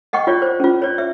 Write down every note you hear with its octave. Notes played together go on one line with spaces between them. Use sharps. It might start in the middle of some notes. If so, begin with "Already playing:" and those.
D#5 F#5 G5 C#6
F4 C#5 D5
C5
C#4 F4
C#5 D5
E5